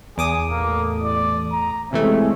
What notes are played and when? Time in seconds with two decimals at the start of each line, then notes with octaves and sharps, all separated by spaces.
0.18 E2 G#4 D6 D#6
0.50 A1 A3 A#3
1.04 D5
1.52 A#5
1.93 C3 E3 G#3 A3 C4 C#4 E5